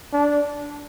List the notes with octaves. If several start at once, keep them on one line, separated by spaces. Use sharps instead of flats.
D4